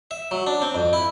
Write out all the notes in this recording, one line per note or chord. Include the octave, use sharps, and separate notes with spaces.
E5
F#3
D4
C4
F2
E4